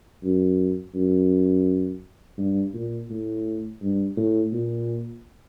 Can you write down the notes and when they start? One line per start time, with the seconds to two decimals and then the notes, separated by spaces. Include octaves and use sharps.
0.23 F#2
0.95 F#2
2.38 G2
2.74 A#2
3.10 A2
3.82 G2
4.17 A2
4.53 A#2